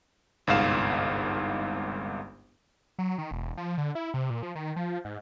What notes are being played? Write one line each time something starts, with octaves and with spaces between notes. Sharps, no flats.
G1 C2 G#2 F5 E7
F#3
D#3
E1
F3
D3
E4
C3
A#2
F3
D#3
F3
G#2